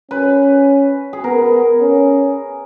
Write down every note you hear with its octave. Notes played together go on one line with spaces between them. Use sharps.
C#4 B4
G#4
B3 A#4
C#4